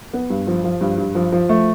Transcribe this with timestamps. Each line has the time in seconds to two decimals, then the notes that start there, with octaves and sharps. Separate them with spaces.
0.13 B3
0.30 G2
0.47 F3
0.64 F3
0.81 G2
0.98 G2
1.15 F3
1.32 F3
1.49 A3